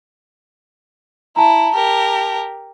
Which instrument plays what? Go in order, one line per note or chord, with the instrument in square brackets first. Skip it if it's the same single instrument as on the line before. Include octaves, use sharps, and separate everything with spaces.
[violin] E4 [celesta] A5 A#5
[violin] G4 A#4